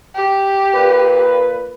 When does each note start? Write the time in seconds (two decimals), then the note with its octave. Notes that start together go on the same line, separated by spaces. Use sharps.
0.15 G4
0.74 A#2 B4